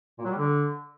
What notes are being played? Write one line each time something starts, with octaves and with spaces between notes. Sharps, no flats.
A#2
F#3
G3
D3